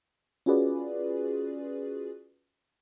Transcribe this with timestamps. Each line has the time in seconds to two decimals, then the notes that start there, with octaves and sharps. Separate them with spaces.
0.46 C#4 F4 F#4 G#4 B4 D5